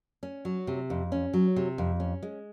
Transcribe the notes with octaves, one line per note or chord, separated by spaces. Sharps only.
C#4
F#3
C3
F2
C#4
F#3
C3
F2
C#4
G#3